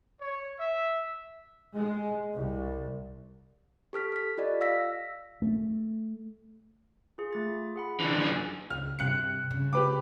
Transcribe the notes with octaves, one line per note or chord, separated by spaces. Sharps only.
C#5
E5
G#3
C2
G4 A4 F6 B6
A4 B6
F4 G4 D5 D#5
F5 E6 A#6 B6
A3
F4 G#4
A3 A6 C#7
F4
G#4 F#5 B5
D3 E3 D4 F4 D5
F#2 G#4 F#5
C#2 F6
G2 C3 F#6 C#7
C#3
G4 B4 D6